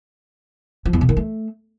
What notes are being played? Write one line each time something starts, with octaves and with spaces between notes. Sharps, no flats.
F3
E2
B2
D#3
A3